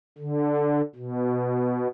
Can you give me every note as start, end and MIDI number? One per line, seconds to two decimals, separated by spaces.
0.18 0.82 50
0.95 1.87 47